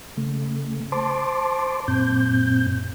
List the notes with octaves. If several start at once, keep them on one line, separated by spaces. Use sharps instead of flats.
C#3 A3
C5 A5 C6 D6
F#2 A#2 C4 G6